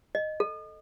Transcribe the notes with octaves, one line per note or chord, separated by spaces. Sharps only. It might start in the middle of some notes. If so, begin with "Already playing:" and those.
D#5
A4